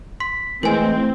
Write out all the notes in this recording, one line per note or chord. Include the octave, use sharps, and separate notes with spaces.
C6 B6
E3 G#3 A3 C4 A#4 G#5